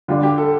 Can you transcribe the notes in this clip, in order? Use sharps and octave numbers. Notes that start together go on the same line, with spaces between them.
D3 G3 D4 F4
G4
A4